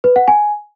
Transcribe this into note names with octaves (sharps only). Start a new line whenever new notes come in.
B4
F#5
G#5